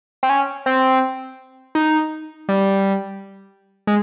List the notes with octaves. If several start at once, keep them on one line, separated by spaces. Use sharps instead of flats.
C4
C#4
C4
D#4
G3
G#3